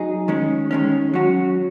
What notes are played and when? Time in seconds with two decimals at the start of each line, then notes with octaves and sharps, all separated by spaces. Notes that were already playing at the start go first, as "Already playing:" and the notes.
Already playing: F#3 D#4 G#4
0.28 D#3 G#3 C#4
0.71 D#3 G#3 C#4
1.13 F#3 C#4 F#4